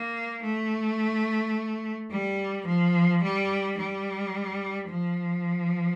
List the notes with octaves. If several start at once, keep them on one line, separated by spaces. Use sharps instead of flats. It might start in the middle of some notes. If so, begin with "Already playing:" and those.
Already playing: A#3
A3
G3
F3
G3
G3
F3